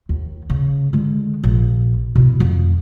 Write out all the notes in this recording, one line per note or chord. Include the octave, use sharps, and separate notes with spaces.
D#2
C#3
D3 G#3
A#1
B2 E4
F2